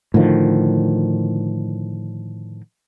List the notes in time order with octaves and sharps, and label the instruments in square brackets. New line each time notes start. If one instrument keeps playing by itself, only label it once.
[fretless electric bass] A2 D3 D#3 F3